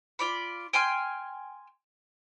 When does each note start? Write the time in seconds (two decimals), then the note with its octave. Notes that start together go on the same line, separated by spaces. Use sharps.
0.19 F4 D5 B5
0.73 G5 G#5 C6 F6